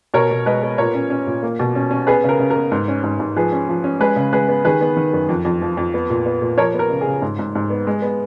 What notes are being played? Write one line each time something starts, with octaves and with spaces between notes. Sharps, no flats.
B2 A#4 C#5
B2
G#3 B4 D#5
B3
A#2 A#4 C#5
C#4
C#4
A#2
A#3
B2
C#4
C#4
B3 G#4 B4
C#3 A#4
C#3
A#4
B3
G#2
C#4
G#2
G#2
F3 G#4 B4
C#4
F3
C#4
G#3 G#4 B4
C#3
G#3 G#4 B4
B3
D#3 G#4 B4
B3
D#3
F#2
F2
F2
F3
F2
B3
A#2
B3
A#2
F3 A#4 C#5
B3
A#4
C#3
G#4
C#3
G#2
G#2
G#2
B3
G#3
B3